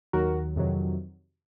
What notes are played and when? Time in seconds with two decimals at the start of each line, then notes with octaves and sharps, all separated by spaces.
0.13 D#2 D#3 F#3 F#4 A#4
0.56 F2 C3 D#3 F#3